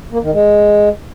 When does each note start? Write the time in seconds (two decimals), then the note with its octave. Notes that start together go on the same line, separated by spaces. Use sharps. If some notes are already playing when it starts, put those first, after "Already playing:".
0.12 A#3
0.22 D#3
0.33 G#3